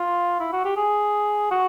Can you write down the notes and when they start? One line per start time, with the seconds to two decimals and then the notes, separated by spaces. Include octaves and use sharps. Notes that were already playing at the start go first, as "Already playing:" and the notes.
Already playing: F4
0.40 E4
0.53 F#4
0.65 G4
0.77 G#4
1.51 F#4